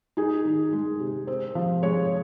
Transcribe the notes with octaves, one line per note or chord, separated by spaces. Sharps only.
D#4 G#4
D#3
G#3
C3
C4
F3
G#3 C#5